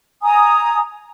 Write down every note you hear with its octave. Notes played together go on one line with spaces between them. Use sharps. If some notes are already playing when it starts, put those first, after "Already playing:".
G#5 A#5 D#6